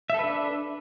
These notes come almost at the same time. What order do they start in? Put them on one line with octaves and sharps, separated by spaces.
E5 A4 B4 D4